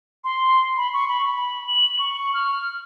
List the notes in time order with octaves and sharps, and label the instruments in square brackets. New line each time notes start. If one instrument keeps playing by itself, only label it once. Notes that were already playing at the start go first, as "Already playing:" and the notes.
[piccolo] C6
B5
C#6
B5
B5
F#7
C#6
F6